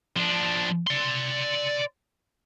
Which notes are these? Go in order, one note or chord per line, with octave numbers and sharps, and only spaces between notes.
F3 D4
D5 C6